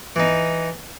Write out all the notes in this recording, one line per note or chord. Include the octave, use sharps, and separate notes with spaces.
E3 D#4